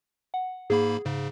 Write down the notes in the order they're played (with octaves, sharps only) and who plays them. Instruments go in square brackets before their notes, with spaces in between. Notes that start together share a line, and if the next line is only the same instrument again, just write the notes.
[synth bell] F#5
[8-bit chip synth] G#2 A#3 B5 [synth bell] G#4
[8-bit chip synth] G#2 C#3